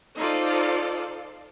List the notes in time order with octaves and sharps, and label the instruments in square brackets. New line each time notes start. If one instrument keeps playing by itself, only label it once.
[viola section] D#4 F4 A4 C5 D5